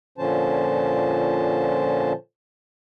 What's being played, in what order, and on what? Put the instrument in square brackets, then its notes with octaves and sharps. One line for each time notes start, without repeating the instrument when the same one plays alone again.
[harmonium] A#2 D3 F3 C#4 C5 A5